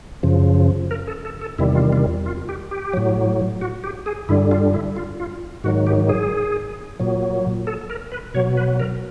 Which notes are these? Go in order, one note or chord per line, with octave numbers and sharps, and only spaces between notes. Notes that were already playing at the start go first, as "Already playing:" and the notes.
F#2 C#3 F3
A#4
A4
A4
A4
E2 C3 D#3 G3 E4
F4
F4
F4
G4
G4
A2 F#3
F#4
G4
G#4
G2 D3 G3 E4
F4
E4
F4
F4
G#2 D#3 F#3 F#4
G4
G#4
A#2 F#3
A4
A#4
B4
B2 F#3 C#5
B4
A#4